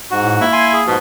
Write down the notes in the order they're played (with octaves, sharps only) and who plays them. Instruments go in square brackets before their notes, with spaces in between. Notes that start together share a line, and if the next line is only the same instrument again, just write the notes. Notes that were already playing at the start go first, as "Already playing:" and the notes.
[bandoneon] G#2 F#4
[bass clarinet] A2
[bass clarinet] A#3 [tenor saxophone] E4
[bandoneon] G#5 C6
G#4
[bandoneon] G#2 F3 [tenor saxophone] B2